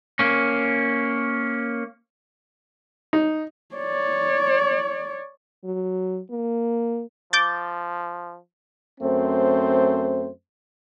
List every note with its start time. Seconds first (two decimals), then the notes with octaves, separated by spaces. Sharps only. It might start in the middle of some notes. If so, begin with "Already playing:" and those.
0.19 A#3 C#4
3.13 D#4
3.75 C#5 D5
5.65 F#3
6.31 A#3
7.33 F3 D6 G6 A6
9.01 F#2 A3 C4 C5